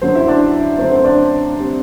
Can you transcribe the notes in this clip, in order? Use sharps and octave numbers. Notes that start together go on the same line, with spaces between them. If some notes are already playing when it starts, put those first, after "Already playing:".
F#2 D3 F#3 C5
E4 E5
D4 D5
F#2 D3 A3 C4 C5
C5
D4 D5
C3 G3 C4